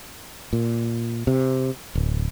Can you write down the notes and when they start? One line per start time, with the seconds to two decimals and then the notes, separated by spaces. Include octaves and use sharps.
0.53 A#2
1.27 C3
1.95 D1